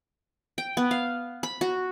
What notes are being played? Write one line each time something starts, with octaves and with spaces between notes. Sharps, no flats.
G5
B3
F5
B5
F#4